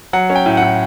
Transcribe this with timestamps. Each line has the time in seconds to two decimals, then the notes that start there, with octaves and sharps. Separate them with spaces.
0.13 F#3 F#5
0.30 C#4
0.35 G5
0.46 A2
0.57 F#5
0.62 A2